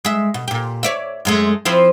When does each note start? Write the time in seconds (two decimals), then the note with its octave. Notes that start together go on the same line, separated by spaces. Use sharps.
0.05 G#3 E5
0.34 B2
0.48 A#2 G4
0.83 C#5 D5 E5
1.25 F#2 G#3 A3
1.65 F3 C4 E4